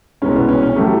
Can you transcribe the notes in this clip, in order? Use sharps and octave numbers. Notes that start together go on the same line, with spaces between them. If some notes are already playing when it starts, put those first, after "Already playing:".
C2 B2 G#3 C#4
B3
C#4
C#4
A2 F#3 A3 G4